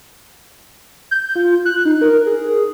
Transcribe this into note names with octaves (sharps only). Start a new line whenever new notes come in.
G6
F4
F#6
D#4
A#4
G#4